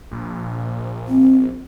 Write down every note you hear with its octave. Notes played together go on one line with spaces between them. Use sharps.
A#1
C4